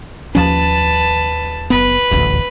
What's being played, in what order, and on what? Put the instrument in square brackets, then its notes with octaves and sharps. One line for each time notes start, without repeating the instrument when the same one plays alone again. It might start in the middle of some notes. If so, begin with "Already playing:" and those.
[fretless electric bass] D#2 F3 C#4 [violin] B4 A5
[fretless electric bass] F#1 B3 [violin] B4
[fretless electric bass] D#1 A1 D2